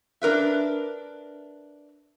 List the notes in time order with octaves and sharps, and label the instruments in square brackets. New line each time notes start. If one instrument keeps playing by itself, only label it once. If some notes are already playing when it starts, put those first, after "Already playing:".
[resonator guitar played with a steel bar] D4 A#4 B4 E5